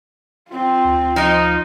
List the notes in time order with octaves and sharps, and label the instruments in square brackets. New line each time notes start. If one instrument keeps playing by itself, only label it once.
[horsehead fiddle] C4 F4
[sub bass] D2
[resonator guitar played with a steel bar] F3 D#5 [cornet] D#4